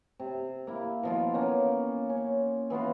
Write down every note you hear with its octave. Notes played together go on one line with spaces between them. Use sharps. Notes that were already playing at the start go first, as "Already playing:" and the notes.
C3
A#3 E4
B2 F3 F4
A#3 C#4 D#4
C#4
E3 B3 F4 F#4